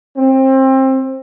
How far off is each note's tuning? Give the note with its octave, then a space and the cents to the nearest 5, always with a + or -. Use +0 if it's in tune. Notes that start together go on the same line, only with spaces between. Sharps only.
C4 +25